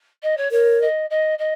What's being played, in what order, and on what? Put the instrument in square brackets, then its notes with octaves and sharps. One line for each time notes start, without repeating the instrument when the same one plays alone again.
[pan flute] D#5
C#5
[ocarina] A#4 [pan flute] C#5
[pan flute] D#5
D#5
D#5